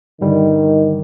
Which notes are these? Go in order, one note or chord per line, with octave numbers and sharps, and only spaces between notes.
G2 D3 D#3 G3